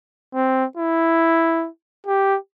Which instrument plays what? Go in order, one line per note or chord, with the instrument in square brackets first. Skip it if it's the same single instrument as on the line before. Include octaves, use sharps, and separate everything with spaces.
[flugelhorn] C4
E4
G4